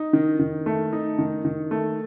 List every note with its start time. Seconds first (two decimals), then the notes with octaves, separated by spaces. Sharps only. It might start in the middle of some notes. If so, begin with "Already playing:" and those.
Already playing: D#4
0.13 D#3
0.39 D#3
0.66 A3
0.93 D#4
1.19 D#3
1.45 D#3
1.71 A3